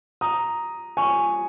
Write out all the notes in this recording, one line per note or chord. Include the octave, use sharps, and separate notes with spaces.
A#5 D#6
G#5 C#6